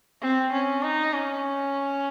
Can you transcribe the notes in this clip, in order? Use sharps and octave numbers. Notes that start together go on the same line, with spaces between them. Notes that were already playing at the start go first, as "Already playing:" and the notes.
C4
C#4
D#4
C#4